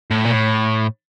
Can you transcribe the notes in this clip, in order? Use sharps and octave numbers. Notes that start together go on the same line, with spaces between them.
A2
A#2
A2